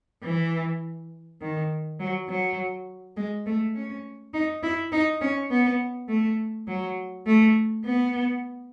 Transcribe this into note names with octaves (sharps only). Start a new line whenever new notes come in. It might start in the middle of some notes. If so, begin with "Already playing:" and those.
E3
D#3
F#3
F#3
G#3
A3
C#4
D#4
E4
D#4
C#4
B3
A3
F#3
A3
B3